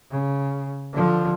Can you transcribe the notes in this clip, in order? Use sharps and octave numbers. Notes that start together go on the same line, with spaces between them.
C#3
D3 F3